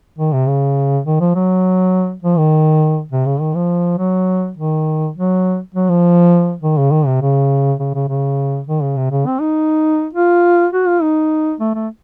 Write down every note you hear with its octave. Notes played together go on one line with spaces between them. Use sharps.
D#3
C3
C#3
D#3
F3
F#3
F3
D#3
C3
C#3
D#3
F3
F#3
D#3
F#3
F#3
F3
D#3
C#3
D#3
C3
C#3
C#3
C#3
C#3
D#3
C#3
C3
C#3
C4
D#4
F4
F#4
F4
D#4
A3
A3